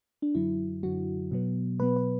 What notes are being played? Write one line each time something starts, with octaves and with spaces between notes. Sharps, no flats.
D4
F#2 D3 F#3 E4
F#2 D3 F#3 F#4
B2 F#3 B3
B2 F#3 B3 B4
B4